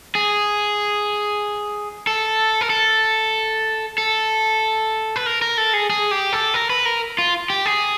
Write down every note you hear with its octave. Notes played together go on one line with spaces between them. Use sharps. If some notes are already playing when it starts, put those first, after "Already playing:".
G#4
A4
A#4
A4
A4
B4
A#4
A#4
A4
G#4
G#4
G4
A4
A#4
B4
A#4
F4
G4
G#4